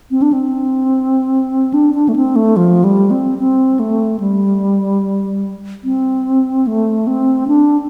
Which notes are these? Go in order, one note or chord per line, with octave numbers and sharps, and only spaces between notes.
C4
D4
C4
D4
D4
A3
C4
A3
F3
G3
C4
C4
A3
G3
C4
A3
C4
D4